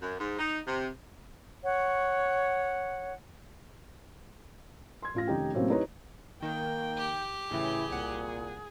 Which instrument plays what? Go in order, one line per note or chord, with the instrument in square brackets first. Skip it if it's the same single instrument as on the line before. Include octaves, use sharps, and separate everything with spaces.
[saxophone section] F#2
G#2
D#4
C3
[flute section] C#5 F#5
[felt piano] C6 G#6
A1 F4 A#6
F1 D#3 C#4 D#4 G4 G5
A2 C3 F#3 A#3 C4 C#4
D#4 E4 G4 B4 C#5 A#5
[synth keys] D#3 [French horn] A#3 [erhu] G5
[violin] G4
[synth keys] A2 C#3 E3 [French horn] E4 [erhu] G#4
[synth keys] C2 F#5 [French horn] A#2